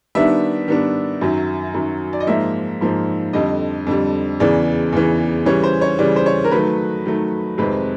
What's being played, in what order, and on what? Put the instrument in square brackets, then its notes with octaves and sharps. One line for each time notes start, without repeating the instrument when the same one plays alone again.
[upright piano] D#3 G3 B3 D4 E5
D#3 G3 B3 D4
F#2 D#3 F#3
F#2 D#3 F#3
D5
D#5
G#2 F3 A#3 D#4 E5
G#2 F3 A#3 D#4
F2 D3 G3 D#5
F2 D3 G3
E2 C#3 E3 D5
E2 C#3 E3
C#3 E3 G3 C#5
C5
C#5
C#3 E3 G3 D5
C5
C#5
A#4
D#3 F#3 A3 B4
D#3 F#3 A3
F2 C3 D#3 G#3 C4 B4